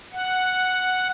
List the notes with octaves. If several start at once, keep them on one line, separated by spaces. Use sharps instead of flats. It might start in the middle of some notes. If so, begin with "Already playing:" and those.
F#5